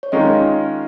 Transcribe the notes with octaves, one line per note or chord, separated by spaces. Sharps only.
C#5
D#3 G#3 C#4 F4 A#4 D#5